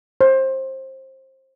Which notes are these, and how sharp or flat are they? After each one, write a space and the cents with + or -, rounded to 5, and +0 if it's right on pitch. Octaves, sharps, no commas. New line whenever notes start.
C5 +25